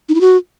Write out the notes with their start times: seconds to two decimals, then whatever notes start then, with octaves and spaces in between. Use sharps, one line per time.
0.09 D#4
0.15 E4
0.21 F#4